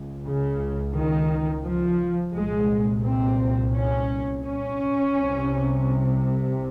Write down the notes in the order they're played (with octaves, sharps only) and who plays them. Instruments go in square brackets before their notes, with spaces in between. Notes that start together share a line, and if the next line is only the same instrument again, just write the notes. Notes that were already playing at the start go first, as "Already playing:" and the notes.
Already playing: [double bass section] C#2
C#3
D#3
F3
C2 A#2 G#3
C4
C#4
C#4
C2 C3